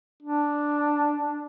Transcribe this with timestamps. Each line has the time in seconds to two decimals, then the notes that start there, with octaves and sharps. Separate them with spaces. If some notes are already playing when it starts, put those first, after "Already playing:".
0.23 D4